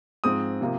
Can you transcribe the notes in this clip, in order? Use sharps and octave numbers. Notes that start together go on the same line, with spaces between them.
G#2 F3 G#3 C4 D#6
C3 F3 A#3